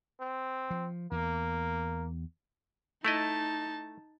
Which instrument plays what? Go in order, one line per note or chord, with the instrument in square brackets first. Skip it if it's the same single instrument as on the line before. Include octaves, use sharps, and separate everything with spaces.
[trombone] C4
[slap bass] F3
[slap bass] E2 [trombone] A#3
[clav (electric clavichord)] A3 E4 D#5 [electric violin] D#4 A5